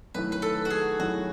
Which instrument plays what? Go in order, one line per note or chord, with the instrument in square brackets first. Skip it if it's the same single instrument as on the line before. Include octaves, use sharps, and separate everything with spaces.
[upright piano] F#2 D#3 A3 E4 [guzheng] B4
[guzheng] B4
A4
F#4
G#4
[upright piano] F#2 D#3 A3 E4 [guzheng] F#4